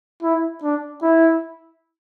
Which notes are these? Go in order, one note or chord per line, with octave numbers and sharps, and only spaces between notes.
E4
D4
E4